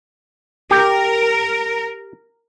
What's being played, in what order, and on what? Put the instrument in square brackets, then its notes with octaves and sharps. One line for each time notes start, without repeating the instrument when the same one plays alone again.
[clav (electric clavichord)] G4 [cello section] A#4